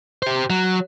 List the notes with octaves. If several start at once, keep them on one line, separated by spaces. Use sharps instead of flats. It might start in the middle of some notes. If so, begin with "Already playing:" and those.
G4 C5
F#3